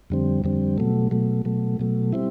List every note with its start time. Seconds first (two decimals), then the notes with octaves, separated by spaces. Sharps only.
0.10 F2 D3 G3 C4
0.44 F2 D3 G3 C4
0.78 B2 F#3 A3
1.11 B2 F#3 A3
1.45 B2 F#3 A3
1.79 B2 F#3 A3
2.13 G3 C4 E4